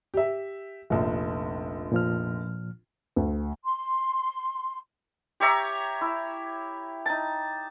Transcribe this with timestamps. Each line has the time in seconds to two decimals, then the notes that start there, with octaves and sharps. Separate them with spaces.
0.14 G4 E5
0.90 F1 A#1
1.92 A#2 F3 F6
3.16 D2
3.64 C6
5.40 G4 C#5 E5 A#5
6.01 E4
7.06 D#4 A5